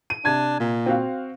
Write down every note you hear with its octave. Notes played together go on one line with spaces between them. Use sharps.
D#7
C3 D4 G#6
A#2
C4 F#4 F5